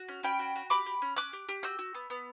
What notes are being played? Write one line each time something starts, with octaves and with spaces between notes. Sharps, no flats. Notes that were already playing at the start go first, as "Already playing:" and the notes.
Already playing: F#4
C#4
C#4 G5 B5
F#4
F#4
G4 B5 D6
G4
C#4
C#4 D6 F#6
G4
G4
F#4 E6 G6
F#4
B3
B3